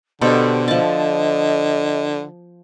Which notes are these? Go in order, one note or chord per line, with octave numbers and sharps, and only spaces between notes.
B2 D3 G4 A4 C5
F3 D#5 A5